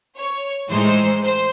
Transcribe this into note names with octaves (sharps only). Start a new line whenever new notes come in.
C#5
A2 E3 G#3 D#4 C5
C5